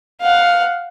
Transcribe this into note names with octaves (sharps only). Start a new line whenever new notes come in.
F5 F#5